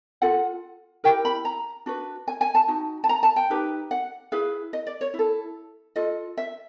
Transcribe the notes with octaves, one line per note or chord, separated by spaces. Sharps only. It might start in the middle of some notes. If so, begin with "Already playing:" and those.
F4 A4 F#5
E4 G4 A#4 G5
B5
A#5
D4 F#4 B4
G#5
G#5
A5
D#4 F#4
A5
A#5
A5
G5
D#4 G4 B4
F#5
E4 G#4 B4 F5
D#5
D5
C#5
E4
A4
F4 A4 D#5
E5